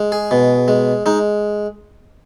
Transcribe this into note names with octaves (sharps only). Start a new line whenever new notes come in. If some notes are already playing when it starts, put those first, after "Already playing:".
Already playing: G#3
G#4
B2
G#3
G#3 D#4